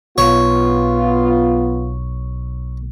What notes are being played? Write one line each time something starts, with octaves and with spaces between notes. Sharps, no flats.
B1 B3 F4 C#5